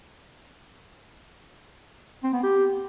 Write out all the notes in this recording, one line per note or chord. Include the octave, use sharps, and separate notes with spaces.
C4
B3
G4